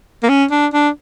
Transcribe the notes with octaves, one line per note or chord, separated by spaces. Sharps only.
A#3
C#4
D4
D4